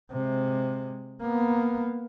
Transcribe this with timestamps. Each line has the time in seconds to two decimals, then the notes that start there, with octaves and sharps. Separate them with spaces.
0.11 C3 G#3
1.21 A#3 B3